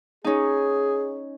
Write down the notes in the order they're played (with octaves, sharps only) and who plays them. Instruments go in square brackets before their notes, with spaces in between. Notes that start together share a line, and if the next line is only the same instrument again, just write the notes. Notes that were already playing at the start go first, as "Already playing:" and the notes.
[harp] C#4 D#4 [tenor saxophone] G#4